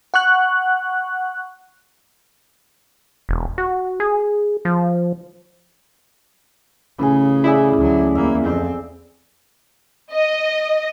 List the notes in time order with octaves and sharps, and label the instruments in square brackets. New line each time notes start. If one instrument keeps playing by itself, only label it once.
[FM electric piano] F#5 C#6 F#6
[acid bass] E1
F#4
G#4
F3
[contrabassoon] A1 [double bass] C#3 [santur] G#4 B4
[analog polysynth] E4 [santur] G#4 D5 D#6
[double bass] D2 F#3
[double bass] E2 A#3 [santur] E5
[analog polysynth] F2 [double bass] C4
[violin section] D#5